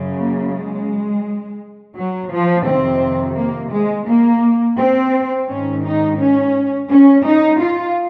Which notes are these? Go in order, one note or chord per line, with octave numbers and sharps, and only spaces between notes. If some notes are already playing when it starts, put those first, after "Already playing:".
Already playing: F#2 C#3
A#3
G#3
F#3
F3
F2 C3 D#3 C4
A#3
G#3
A#3
C4
G#2 D#3 C#4
D#4
C#4
C#4
D#4
F4